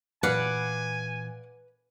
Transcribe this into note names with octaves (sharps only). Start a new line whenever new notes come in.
A#2 E3 B4 D5 F5 F#5 G#5